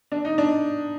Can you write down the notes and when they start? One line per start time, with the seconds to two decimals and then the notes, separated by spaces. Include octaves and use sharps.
0.12 D4
0.25 D#4
0.38 D4